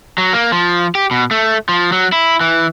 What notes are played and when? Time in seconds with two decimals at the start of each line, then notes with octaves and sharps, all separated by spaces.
0.18 F#3
0.33 A#3
0.52 F3
0.95 G4
1.11 B2
1.31 A3
1.69 F3
1.92 F#3
2.12 E4
2.41 E3